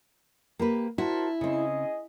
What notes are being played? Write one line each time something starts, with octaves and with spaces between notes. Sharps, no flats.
A#3 G4 B4
E4 F#4 A#4 C5 A5
C#3 C4 G#4 D#5